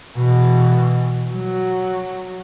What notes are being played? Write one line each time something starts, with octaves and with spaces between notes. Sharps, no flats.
B2 E3
F#3